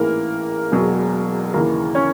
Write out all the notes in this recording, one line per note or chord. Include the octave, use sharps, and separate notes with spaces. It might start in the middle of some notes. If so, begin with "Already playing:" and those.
Already playing: A1 G#2 E3 A#3 A#4
E1 E2 B2 F#3
D#2 C#3 E3 A#3 A#4
C#4 C#5